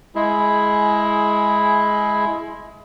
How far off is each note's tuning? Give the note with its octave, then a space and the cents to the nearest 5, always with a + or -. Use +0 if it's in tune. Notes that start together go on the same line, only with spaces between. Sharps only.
G#3 +15 E4 +0 G#4 +20